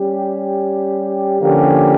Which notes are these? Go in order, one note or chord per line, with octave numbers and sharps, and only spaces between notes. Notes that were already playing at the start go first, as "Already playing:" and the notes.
Already playing: G3 C#4 G4
D3 F3 A#3 C#4 G4